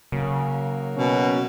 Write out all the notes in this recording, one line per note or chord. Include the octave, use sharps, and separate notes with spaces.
C#3 F#3 A#3
B2 C#4